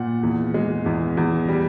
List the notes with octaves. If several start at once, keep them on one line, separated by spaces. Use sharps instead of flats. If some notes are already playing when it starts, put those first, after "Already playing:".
Already playing: A#2 F#5
E2
G#3
E2
E2
G3